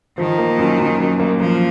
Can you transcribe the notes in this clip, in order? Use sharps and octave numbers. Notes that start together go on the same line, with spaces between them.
D#3 F3
A#3
F#2
F#2
F#2
A#3
F3 A#3